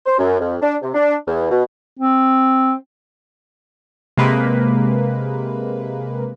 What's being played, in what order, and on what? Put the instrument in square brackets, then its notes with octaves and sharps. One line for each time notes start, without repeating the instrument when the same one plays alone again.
[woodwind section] C5
F#2
F2
D4
C3
D4
E2
B2
[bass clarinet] C4
[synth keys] C3 G#3 A#3 B4